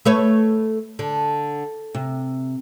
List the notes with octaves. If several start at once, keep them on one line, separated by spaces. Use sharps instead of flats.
A3 B4 C#5
D3
C3